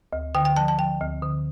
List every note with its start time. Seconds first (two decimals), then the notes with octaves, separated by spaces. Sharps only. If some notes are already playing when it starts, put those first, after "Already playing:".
0.13 D2
0.35 D3 G5
0.45 G5
0.56 F3 A5
0.68 A5
0.78 F3 G5
1.01 D2
1.22 D3